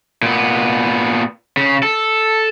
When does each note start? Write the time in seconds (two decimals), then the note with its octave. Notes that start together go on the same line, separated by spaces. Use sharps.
0.23 A#2 B3
1.57 C#3
1.83 A4